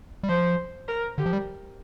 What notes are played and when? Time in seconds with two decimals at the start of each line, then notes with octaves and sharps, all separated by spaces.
0.23 G3
0.29 F3 C5
0.88 A#4
1.18 D3 G4
1.26 F3
1.33 G3